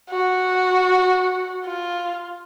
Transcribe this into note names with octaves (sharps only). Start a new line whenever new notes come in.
F#4
F4